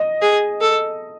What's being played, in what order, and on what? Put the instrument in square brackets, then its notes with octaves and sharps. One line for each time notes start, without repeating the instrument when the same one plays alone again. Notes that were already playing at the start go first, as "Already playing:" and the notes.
Already playing: [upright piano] D#5
[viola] G#4
A4